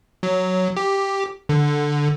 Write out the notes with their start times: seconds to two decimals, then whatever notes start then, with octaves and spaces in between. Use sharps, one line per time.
0.23 F#3
0.77 G4
1.49 D3